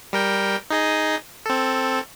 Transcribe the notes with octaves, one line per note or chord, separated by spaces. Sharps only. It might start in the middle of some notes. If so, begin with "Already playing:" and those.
G3 A#4 G5
D#4 G#4 D#5
C4 A4